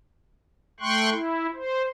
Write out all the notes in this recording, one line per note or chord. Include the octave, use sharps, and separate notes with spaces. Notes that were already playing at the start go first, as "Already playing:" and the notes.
A3 G5 C6 C#6 F#6
E4
C5